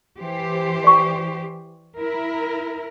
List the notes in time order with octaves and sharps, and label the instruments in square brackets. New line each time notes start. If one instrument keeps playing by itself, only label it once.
[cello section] E3 G4 C5
[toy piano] D5 C#6
[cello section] E4 A#4